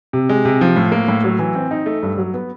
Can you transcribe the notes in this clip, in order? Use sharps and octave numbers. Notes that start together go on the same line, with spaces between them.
C3
G#3
C3
F3
A2
A#3
A2
F#3
E3
C4
D#4
A3
G2
F#3
B3